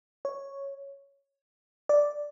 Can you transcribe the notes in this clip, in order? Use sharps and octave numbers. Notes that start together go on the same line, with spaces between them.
C#5
D5